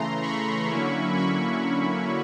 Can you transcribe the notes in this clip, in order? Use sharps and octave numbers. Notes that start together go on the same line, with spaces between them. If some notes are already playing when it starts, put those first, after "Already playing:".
Already playing: C#3 E3 A3 A#5 C6
B5 C#6
D3 F#3 A#3 C#4 E4
B5 C#6